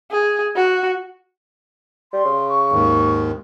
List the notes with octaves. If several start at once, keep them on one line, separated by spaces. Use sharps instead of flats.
G#4
F#4
G3 C6
C#3
C#6
D#2 G#2 D#3